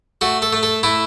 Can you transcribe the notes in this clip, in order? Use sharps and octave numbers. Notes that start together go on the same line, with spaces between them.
A3 F#4
A4
A3
A4
A3 E4